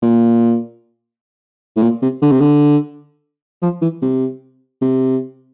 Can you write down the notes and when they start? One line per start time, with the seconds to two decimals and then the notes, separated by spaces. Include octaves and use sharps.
0.02 A#2
1.77 A2
1.82 A#2
2.02 C3
2.22 D3
2.32 C3
2.40 D3
3.62 F3
3.82 E3
4.02 C3
4.81 C3